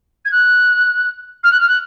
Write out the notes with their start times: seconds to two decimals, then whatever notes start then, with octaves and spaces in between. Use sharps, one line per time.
0.25 G#6
0.31 F#6
1.43 F6
1.51 F#6
1.60 F6
1.68 F#6